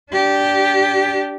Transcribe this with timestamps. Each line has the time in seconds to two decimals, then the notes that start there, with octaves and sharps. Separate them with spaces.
0.12 D4 G4